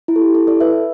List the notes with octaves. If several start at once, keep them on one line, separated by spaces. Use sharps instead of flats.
E4
A4
G4
E4 A4
A4 D5
B4 E5